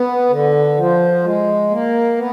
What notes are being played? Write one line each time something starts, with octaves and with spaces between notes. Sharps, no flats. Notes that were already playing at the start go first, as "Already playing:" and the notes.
Already playing: B3
D3
F3
G#3
A#3
B3